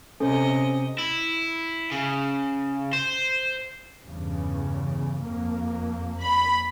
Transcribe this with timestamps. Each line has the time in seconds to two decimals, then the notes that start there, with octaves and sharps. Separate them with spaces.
0.20 C3 C#4 A4 C5 D#5
0.99 E4
1.91 C#3
2.93 C5
4.04 E2 G2 C#3
5.17 F2 A#3
6.22 B5